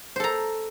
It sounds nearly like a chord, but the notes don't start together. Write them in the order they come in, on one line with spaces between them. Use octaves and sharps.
C5 A4 A#5